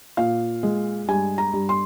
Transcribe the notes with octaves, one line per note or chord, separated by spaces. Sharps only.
A#2 F5
G#3
G2 G#5
A#5
G2
C6